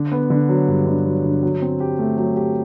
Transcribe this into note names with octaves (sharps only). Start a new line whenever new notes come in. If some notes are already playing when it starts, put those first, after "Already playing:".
Already playing: D3
B3
D3
F#3
G2
D3
F#3
D3
F#3
C4
G4
A3
F#3
G4